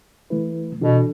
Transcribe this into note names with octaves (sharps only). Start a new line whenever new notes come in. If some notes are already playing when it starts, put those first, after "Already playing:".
E3 A3 E4 B4
B2 E3 D4 F#4 A4